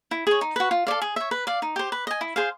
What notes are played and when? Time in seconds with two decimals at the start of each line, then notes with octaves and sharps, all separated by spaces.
0.11 E4
0.27 G#4 C#5
0.41 D#4
0.56 F#4 B4
0.71 F4
0.87 A4 D5 F5
1.02 G#4
1.16 C#5 E5
1.31 B4
1.47 D5 F5
1.62 D#4
1.76 G4 C5
1.92 B4
2.07 D#5 G#5
2.21 E4
2.36 G#4 C5 F5